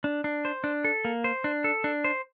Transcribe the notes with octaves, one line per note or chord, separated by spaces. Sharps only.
D4
D4
C5
D4
A4
A#3
C5
D4
A4
D4
C5